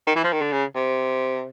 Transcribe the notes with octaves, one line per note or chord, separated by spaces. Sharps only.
D#3
E3
F3
D#3
D3
C#3
C3